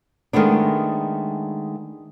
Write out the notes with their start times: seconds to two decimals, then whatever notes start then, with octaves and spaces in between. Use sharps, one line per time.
0.33 D#3 G#3 A3 B3 D4